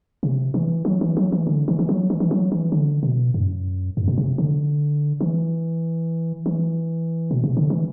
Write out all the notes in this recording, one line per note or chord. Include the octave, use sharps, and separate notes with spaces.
C3
E3
F#3
E3
F#3
E3
D3
E3
E3
F#3
E3
E3
F#3
E3
D3
B2
F#2
F#2
B2
C3
D3
E3
E3
B2
C3
D3
E3